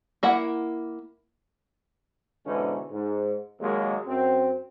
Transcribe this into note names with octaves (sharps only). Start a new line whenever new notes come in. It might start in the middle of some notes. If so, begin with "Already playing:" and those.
A#3 E4 F#5
G#2 B2 D3 E3 C#4 D#4
G#2
D#2 F#3 G#3 A#3
F#2 C4